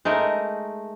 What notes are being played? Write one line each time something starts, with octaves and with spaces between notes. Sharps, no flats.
G#3 A3 D#4 A#4